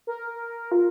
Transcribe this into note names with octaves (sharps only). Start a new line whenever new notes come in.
A#4
F4